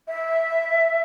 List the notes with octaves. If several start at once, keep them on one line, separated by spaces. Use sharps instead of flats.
E5